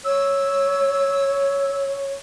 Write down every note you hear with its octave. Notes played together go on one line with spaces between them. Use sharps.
C#5 E6